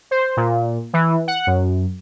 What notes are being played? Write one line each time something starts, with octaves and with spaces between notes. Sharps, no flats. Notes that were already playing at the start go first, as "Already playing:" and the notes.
C5
A#2
E3
F#5
F#2